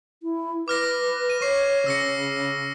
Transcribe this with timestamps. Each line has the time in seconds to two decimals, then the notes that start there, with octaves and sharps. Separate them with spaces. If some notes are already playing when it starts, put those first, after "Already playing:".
0.23 E4
0.68 B4 D6 F6 A#6
1.30 D#7
1.42 C#5 C#6 C7
1.86 C#3 E6 A#6 C#7